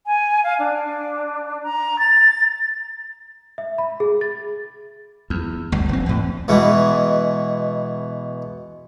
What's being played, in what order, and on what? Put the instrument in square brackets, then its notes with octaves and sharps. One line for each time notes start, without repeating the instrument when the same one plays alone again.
[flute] G#5
F5
D4
A#5
A6
[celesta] E5
B5
G#4
A6
[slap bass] E2
G1 D2
F1 C4
E2 A2
[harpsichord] B2 E3 G#3